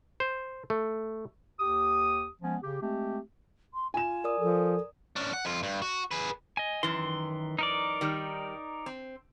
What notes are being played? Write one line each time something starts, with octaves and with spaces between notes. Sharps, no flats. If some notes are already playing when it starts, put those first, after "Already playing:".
C5
A3
D#2 G4 D#6
F3 G#3 B3 C#4
C#3 G4
G#3 A3 C4 G4
C6
F4 G#5 E7
A#4 D5 D#6
F3 A4
C#4 D4
F#5
F2 F4
G2
F#4
G#4 B4
D#5 G#5
F#2 D#3 E3 C6
D#4 A#4 D5
D#3 G3
C4